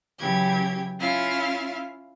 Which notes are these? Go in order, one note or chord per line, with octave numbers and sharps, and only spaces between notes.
C#3 E3 F#3 G4 G5 G#6
C#4 E4 F4 E5 F5